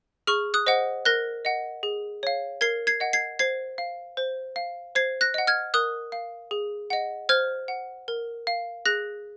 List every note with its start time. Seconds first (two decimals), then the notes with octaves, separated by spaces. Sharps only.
0.27 G#4 C#6 F6
0.54 D#6 F#6
0.67 C5 D#5 F#5
1.05 A#4 F#6 A#6
1.45 D#5 F#5
1.83 G#4
2.23 C#5 F5
2.61 A#4 G#6 C7
2.87 G#6 C7
3.00 D#5 F#5
3.13 G#6 C7
3.39 C5 G#6 C7
3.78 F5
4.17 C5
4.56 F5
4.95 C5 G#6 C7
5.21 F#6 A#6
5.34 D#5 F#5
5.47 F6 G#6
5.74 A#4 D#6 F#6
6.12 F5
6.51 G#4
6.90 D#5 F#5
7.29 C5 F6 G#6
7.68 F#5
8.08 A#4
8.47 F5
8.86 G#4 F#6 A#6